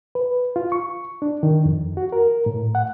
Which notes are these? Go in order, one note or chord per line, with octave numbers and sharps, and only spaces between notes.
B4
F4
C#6
D4
D#3
F2
F#4
A#4
A2
F#5